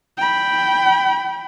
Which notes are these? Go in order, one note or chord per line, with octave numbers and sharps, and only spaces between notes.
G5 B5